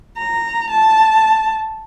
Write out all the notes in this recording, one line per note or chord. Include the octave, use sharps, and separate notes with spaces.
A#5
A5